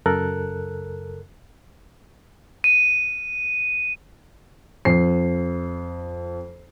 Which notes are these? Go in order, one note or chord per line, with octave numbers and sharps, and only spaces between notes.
F#2 C#3 A4 A#4 F#6
D#7
F2 C7